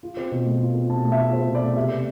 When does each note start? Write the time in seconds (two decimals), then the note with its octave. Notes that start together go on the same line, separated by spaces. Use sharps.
0.03 F4
0.17 C4
0.31 B2
0.46 A3
0.61 F4
0.75 C4
0.89 B2 A5
1.04 A3
1.12 E5
1.18 F4
1.33 C4 C5
1.48 B2
1.55 D5
1.63 A3
1.76 C3 E5
1.91 B3